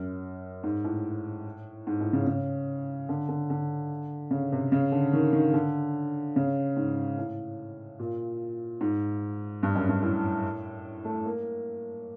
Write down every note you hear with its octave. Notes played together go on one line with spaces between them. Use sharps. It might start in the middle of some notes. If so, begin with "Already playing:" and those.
Already playing: F#2
G#2
A2
G#2
A2
C#3
C#3
D3
D3
D3
C#3
C3
C#3
D3
D#3
D#3
D3
C#3
G#2
A2
A#2
G#2
G2
F#2
G2
A2
A3
A#3